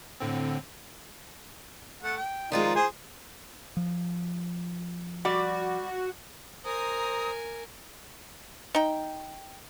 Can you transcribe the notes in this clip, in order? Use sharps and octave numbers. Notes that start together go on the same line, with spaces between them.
A2 D3 C4
A3 F#5
G5
D#3 F3 G#3 D#4 F4 D5
G#4 C5 G#5
F3
G3 F#4 D5
A#4 C5 G#5 A#5 D#6
D#4 G5